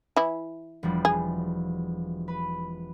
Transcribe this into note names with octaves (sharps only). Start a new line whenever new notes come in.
E3 E4
E1 F3 G3
G#4
B4